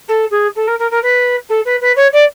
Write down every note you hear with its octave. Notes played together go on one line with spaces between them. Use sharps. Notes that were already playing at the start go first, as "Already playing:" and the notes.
A4
G#4
A4
A#4
A#4
A#4
B4
A4
B4
B4
C#5
D5